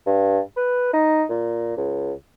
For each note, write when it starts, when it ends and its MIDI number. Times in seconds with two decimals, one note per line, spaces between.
0.06 0.39 43
0.57 0.89 71
0.93 1.23 63
1.30 1.76 46
1.77 2.12 37